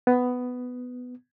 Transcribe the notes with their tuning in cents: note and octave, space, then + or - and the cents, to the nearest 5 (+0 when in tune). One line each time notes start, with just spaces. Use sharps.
B3 +10